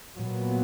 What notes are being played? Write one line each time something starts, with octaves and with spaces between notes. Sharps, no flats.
A#2 F#3 B3